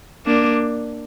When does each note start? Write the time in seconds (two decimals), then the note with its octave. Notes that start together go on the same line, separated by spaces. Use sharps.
0.26 A#3 D4